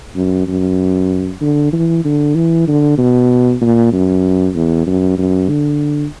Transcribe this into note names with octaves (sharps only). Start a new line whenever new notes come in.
F#2
F#2
D3
E3
D3
E3
D3
B2
A#2
F#2
E2
F#2
F#2
D3